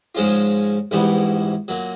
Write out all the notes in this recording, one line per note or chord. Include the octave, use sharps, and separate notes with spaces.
G#2 F3 G#3 C#4 F4
A#1 G#2 E3 G3 B3
A#2 F#3